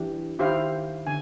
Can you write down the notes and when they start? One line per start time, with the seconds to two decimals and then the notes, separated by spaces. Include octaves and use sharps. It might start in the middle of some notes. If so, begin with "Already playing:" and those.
Already playing: E3 D4 G4
0.39 D#3 E4 G4 C5 F5
1.07 D3 G#5